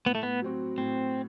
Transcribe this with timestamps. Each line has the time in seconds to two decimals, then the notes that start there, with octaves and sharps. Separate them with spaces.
0.05 A2 B3
0.15 A3
0.23 B3
0.41 F#3 C4 F#4
0.78 A2 C4